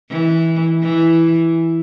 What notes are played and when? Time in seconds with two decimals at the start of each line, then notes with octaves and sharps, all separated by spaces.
0.10 E3
0.83 E3